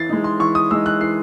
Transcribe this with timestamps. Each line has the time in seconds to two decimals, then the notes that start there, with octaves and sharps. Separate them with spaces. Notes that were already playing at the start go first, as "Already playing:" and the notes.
Already playing: E3 A6 C7
0.09 G#3 D#4
0.24 C6
0.40 E3 C#6
0.55 D#6
0.71 G#3 D#4 E6
0.86 F#6
1.01 E3 C7